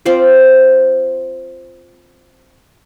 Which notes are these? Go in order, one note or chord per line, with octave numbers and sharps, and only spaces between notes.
C4 F4 C5 D5